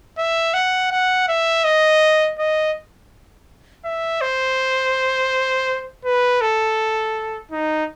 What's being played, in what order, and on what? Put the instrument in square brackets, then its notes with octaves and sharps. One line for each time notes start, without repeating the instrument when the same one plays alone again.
[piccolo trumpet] E5
F#5
F#5
E5
D#5
D#5
E5
C5
B4
A4
D#4